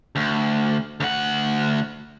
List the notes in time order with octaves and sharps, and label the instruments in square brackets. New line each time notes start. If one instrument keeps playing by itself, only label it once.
[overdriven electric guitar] D2
D2 F#5